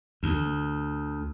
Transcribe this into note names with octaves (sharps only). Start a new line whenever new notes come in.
D2